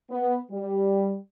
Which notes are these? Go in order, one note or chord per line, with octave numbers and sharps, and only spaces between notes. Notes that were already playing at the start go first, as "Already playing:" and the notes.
B3
G3